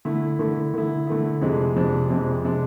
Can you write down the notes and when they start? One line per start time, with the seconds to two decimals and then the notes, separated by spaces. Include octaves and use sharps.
0.05 D3 A3 E4
0.39 D3 A3 E4
0.74 D3 A3 E4
1.07 D3 A3 E4
1.41 F2 C3 G#3 D4
1.76 F2 C3 G#3 D4
2.10 F2 C3 G#3 D4
2.45 C3 G#3 D4